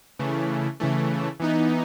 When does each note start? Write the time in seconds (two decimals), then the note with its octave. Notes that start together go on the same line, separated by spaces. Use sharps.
0.19 C#3 E3 A3
0.80 C#3 E3 A3
1.40 E3 B3 D#4